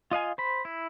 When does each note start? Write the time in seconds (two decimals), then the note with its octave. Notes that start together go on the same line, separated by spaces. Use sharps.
0.11 F4 D#5 F5 G#5
0.38 C5 B5
0.65 E4